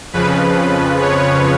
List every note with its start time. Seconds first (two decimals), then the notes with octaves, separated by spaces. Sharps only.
0.13 F2 C#3 F3 B4
1.01 C#5